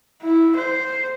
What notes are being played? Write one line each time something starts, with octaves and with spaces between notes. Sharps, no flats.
E4
C5